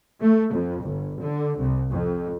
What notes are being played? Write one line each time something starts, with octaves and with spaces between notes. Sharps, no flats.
A3
F2
G1
D3
C2
F2